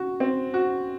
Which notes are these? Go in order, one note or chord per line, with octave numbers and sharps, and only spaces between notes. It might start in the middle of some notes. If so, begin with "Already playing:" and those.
Already playing: F#4
C4
F#4